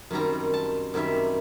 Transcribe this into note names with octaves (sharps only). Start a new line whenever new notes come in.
F#2 D#3 G3 C4 A#5
A5
F#2 D#3 G3 C4 E5